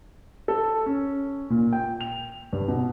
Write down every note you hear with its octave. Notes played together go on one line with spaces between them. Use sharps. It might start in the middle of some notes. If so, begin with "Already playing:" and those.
A4
C#4
A#2
G5
F7
G2
B2